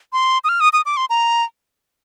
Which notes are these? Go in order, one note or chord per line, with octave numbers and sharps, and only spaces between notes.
C6
D#6
F6
D#6
D#6
D6
C6
A#5